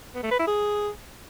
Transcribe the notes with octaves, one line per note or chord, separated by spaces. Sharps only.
B3
A3
B4
E4
G#4